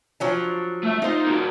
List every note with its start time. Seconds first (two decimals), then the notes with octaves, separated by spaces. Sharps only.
0.20 F3 F#3 D4
0.83 A3 E5
1.02 D#4 F4 C5
1.26 A#3 F#4